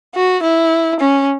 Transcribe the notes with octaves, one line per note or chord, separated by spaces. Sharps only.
F#4
E4
C#4